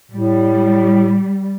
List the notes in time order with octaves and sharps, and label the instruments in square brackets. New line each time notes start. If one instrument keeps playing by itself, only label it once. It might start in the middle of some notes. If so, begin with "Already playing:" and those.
[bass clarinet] A2 [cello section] G3